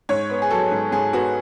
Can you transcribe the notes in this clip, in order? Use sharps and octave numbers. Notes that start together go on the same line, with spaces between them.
G#2 C#5
B3
G#4
F#3 A4
G#2
G#2 G#4
B3 F#4